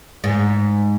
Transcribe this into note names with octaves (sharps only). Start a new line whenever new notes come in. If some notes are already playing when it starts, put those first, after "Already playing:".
G#2